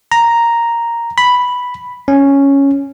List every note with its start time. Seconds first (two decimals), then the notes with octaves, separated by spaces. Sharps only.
0.12 A#5
1.18 B5
2.08 C#4